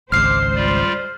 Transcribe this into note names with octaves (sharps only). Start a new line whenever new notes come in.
G#1 C#2 G#3 C5 D6 F6 C7
G3 F4 D5